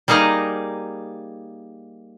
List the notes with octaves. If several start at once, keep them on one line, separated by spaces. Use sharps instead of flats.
G3 A#3 D#4 G#4 A#4 D#5